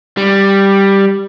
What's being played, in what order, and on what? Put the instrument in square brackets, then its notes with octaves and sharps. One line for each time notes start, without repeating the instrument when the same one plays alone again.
[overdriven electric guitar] G3